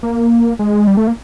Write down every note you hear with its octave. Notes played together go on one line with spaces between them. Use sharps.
A#3
G#3
G3
A3
A#3